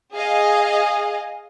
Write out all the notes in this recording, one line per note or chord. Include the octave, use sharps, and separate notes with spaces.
G#4 D#5 F5